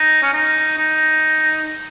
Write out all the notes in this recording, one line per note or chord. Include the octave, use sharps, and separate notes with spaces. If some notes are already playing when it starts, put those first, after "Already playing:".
Already playing: D#4
C#4
D#4
D#4